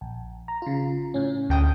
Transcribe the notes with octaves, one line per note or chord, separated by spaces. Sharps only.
A#1
A#5
C#3 F4
A2 C#4
D2 G5 D#6